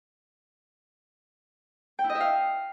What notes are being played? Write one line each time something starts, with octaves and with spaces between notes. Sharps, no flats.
G5
E4
D#5
E5
F5